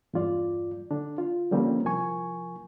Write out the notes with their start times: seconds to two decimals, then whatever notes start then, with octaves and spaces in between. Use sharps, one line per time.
0.13 E2 G2 F4 D5
0.91 D3 D4
1.18 F4
1.51 D3 F3 G3 A#3 C4 C#4
1.85 C2 F3 A#4 G#5 C#6